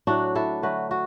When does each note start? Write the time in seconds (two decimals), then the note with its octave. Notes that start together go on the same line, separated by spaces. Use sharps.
0.07 A2 F#3 A3 D4 F#4
0.35 E4 A4
0.63 D3 F#3 A3 F#4 B4
0.91 F#4